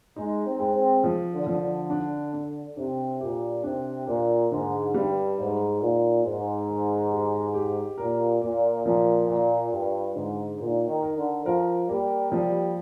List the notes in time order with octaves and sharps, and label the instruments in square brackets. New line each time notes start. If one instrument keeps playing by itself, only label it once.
[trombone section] G#3 [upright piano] D#4
[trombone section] C4
[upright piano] G#3
[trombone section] C4
[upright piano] F3
[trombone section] D3
[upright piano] F3
[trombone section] D3
[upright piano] D4
D4
[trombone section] C3 [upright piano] D4
[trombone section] A#2 [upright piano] G4
[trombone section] C3 [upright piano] D4
[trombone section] A#2 [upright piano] A#3
[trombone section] G#2 [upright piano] D3
[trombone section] G2 [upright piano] G3
[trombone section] G#2 [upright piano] D#4
[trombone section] A#2 [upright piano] D#4
[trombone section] G#2 [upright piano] G#3
[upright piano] D#3
G4
G4
[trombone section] A#2 [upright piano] A#4
[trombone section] A#2 [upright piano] A#3
[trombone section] A#2 [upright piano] F3
[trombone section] A#2 [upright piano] F4
[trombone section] G2 [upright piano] F4
[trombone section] G#2 [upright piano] D3
[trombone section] A#2 [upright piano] D#4
[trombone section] D#3
[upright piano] A#4
[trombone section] D3
[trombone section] F3 [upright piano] A#4
[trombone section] G3 [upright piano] A#3
[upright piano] F3 [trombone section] G3